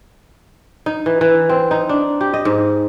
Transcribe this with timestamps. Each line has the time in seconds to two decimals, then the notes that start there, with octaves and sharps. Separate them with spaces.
0.86 D#4
1.06 E3
1.21 E3
1.50 C4
1.71 D#4
1.89 D4
2.21 G4
2.34 D#5
2.45 G#2